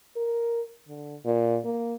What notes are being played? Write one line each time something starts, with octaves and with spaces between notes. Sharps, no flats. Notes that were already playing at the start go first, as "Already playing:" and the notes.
A#4
D3
A#2
A#3